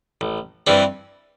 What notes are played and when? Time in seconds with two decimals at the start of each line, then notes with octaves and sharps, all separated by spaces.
0.21 A1
0.67 G2 E3 G3 C4